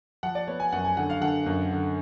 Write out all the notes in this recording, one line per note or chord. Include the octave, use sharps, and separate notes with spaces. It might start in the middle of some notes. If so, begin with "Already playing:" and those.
F3 F#5
D5
B3 C#5
G#5
F#2 F#5
G#5
D3 F#5
F5
D3 F#5
F#2
D3